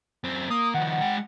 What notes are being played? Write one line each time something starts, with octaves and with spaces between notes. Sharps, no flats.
F#2 C4
A#3 D#6
D#3 F3 F#5
G#3 G5